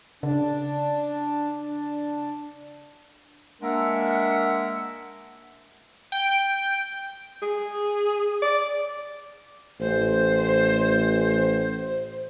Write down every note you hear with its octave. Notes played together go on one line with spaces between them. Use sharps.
C#3 D4
D4
G#3 A#3 D4 A#4 E5 F#5
G5
G#4
D5
A1 C5